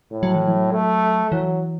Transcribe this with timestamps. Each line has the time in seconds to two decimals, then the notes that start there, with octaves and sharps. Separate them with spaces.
0.12 A2
0.23 F#3
0.35 E3
0.47 F#3
0.72 A3
1.31 E3 F#3